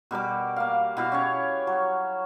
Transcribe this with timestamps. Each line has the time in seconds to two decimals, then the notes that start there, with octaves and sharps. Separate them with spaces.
0.11 B2 G3 A#4 D6
0.56 A#3 F5
0.97 B2 E4 F5
1.12 C#4 G4 C#5
1.67 F#3